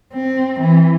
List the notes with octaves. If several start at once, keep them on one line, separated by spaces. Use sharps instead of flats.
C4
E3